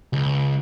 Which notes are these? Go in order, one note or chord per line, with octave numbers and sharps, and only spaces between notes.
C#2